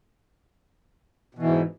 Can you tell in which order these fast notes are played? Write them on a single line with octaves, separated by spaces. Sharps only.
B2 E3 G#2